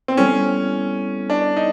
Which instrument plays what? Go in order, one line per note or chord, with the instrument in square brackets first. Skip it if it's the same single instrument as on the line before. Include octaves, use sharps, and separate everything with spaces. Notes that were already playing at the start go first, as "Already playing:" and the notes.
[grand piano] C4
[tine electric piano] G3 B3 E4 A4 C#5 [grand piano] C#4
[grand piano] D4
D#4